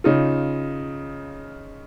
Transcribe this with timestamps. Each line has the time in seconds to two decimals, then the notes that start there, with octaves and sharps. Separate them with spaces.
0.04 C#3 D#4 F4